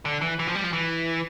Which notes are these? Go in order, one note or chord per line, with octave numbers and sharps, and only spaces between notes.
D3
E3
E3
F3
G3
F3
E3